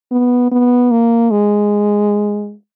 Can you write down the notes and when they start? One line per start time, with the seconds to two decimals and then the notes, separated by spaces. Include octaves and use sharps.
0.12 B3
0.52 B3
0.91 A#3
1.31 G#3